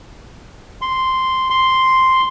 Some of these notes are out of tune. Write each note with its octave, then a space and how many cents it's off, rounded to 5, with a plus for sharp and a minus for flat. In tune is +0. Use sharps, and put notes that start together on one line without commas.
C6 -5
C6 +0